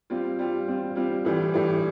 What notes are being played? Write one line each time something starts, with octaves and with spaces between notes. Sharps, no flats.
G3 C4 F4
G3 C4 F4
G3 C4 F4
G3 C4 F4
A2 E3 G3
A2 E3 G3